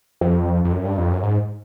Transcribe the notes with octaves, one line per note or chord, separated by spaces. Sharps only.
F2
F2
F#2
G2
F2
F#2
G#2